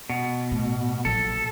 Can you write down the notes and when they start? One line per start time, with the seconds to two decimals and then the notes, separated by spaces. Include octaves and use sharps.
0.10 B2
0.51 A2
1.05 A#1 F#3 A4